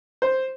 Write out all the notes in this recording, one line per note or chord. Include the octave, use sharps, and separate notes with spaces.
C5